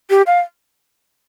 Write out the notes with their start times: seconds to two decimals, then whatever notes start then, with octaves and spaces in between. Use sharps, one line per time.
0.10 G4
0.27 F5